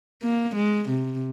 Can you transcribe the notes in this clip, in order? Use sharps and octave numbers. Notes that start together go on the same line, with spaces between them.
A#3
G#3
C3